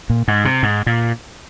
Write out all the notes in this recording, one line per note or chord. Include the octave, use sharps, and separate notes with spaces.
A#2
G#2
C3
G#2
A#2